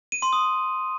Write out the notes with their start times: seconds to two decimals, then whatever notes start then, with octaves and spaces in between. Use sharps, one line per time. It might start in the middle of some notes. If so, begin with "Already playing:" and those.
0.12 D#7
0.22 C6
0.33 D#6